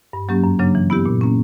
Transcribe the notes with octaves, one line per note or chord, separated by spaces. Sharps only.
G2
F#3 A#3 C#4 G4
F#2
C#3 F#3 A#3 D4
E3
B3 E4 G4
A#2
A#3 C#4